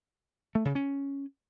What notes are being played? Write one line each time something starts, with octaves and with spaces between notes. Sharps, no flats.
A3
C#3
C#4